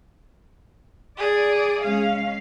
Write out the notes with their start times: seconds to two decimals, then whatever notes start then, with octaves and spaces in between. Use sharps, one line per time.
1.17 G#4 D5
1.82 G#3 C#4 F5